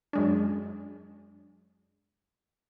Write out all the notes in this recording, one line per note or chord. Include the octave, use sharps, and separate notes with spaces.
F#2 G#3 D4